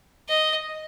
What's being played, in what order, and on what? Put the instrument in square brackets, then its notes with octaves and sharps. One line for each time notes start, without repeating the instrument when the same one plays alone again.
[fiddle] D#5